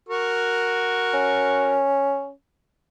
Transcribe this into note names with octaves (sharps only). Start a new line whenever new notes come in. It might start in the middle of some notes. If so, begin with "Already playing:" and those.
F#4 A#4 C#6
C#4